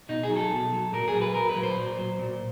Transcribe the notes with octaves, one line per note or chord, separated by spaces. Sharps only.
B2 D#4
G#4
F#3
A4
B2
F#3
A#2 A#4
G#4
F#3
B4
A#2 A#4
B4
F#3
C5
A#2
F#3
A#2